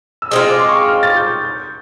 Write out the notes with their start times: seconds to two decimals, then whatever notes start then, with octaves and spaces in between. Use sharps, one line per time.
0.22 E6
0.31 G#3 C4 F4 D#6
0.49 D6
0.60 C6
0.69 C#6
0.88 F6
1.03 A6
1.17 G6
1.44 G6